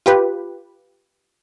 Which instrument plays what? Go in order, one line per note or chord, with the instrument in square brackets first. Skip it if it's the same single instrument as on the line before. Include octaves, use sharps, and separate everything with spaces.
[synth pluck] F4 G4 B4